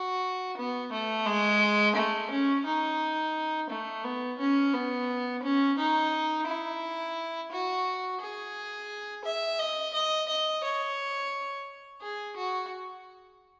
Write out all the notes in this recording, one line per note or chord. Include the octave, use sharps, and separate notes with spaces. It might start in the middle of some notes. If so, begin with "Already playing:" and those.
Already playing: F#4
B3
A3
G#3
A3
C#4
D#4
A3
B3
C#4
B3
C#4
D#4
E4
F#4
G#4
E5
D#5
D#5
D#5
C#5
G#4
F#4